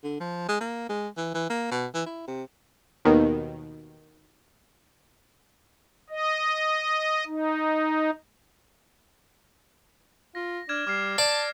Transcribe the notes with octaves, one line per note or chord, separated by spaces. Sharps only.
D3
F3
G#3
A#3
G#3
E3
E3
A#3
B2
E3
E4
C3
D#2 B2 D#3
D#5
D#4
F4 A#6
D4 F6 G#6 E7
G3 D6 F6 C7
D5 A5